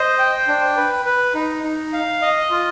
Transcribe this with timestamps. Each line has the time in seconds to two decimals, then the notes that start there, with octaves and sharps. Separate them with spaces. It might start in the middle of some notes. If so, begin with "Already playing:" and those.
Already playing: C5 D#5
0.19 G5
0.48 D4
0.76 B4
1.05 B4
1.35 D#4
1.63 D#4
1.93 F5
2.22 D#5
2.51 F4